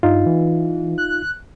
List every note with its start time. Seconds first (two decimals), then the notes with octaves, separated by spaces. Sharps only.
0.03 G2 D#4 F4
0.26 E3
0.98 F#6